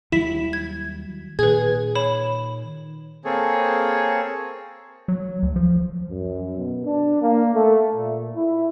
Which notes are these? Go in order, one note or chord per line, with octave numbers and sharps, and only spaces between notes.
D#2 F#3 G3 E4 B6 E7
G#6
A#2 D#3 G#4 B4 G#6
C#5 B5 E7
A#3 C4 G#4 A4 C#5
F#3
D2
F3
F#2
B2
D4
A#3
A3
A#2
E4